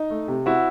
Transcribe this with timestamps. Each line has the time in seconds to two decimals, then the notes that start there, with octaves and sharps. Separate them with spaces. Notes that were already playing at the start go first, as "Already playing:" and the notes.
Already playing: D#4
0.10 A3
0.28 C3
0.46 C4 E4 F#4